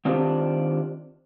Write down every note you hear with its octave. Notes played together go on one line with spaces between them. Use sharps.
D#3 C4 D4 F4 G4 C5